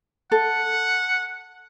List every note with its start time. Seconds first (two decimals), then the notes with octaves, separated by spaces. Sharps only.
0.32 A4 F#5